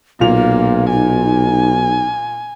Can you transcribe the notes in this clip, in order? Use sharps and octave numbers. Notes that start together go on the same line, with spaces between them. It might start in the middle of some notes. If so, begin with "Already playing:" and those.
B1 A#2 A#3 F5 F7
D#4 G#5